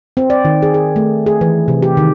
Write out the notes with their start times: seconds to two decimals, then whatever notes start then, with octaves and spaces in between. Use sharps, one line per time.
0.17 C4
0.30 D5
0.45 D#3
0.62 G#4
0.74 G#4
0.96 A3
1.26 G#4
1.41 E3
1.68 C3
1.82 G4
1.97 D#3